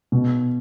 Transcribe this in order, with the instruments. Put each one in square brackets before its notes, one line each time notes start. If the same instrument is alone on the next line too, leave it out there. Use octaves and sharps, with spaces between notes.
[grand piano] B2